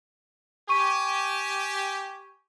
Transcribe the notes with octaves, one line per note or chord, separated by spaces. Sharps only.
G4 G#5 C#6 D#7